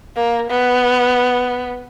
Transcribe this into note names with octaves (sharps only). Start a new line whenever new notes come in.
A#3
B3